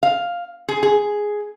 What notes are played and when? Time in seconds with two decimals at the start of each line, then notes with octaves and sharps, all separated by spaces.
0.03 F5
0.69 G#4
0.83 G#4